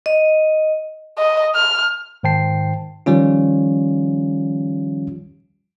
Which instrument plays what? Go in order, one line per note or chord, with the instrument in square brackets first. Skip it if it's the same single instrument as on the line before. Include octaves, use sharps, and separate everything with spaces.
[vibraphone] D#5
[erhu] D#5
F6
[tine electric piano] G#2 D#3 C5 G5 A5 C7
D#3 F3 G3 C#4 F4